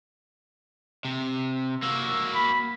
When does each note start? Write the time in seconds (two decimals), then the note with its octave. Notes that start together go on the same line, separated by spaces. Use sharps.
1.05 C3
1.82 A#3 F#4 E6
2.35 B5